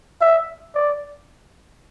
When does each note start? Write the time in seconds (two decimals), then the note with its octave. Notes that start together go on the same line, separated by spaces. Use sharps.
0.21 E5
0.75 D5